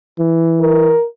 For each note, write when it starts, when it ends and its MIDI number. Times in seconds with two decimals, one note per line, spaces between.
0.19 0.94 52
0.61 1.05 70